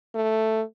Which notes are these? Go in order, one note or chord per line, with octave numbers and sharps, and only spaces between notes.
A3